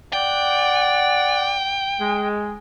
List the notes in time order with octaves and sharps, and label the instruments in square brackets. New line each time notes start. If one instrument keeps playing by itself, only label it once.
[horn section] D5 F#5 [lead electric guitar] G5
[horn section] G#3